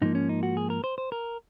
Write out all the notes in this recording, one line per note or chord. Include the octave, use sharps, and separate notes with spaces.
G#2 F3 A#3 D#4
C#4
D#4
F#4
G#4
A#4
C5
C5
A#4